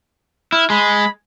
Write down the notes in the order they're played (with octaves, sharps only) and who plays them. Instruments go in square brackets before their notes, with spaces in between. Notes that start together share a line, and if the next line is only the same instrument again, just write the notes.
[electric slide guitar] E4 [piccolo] F6
[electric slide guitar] G#3 [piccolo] B5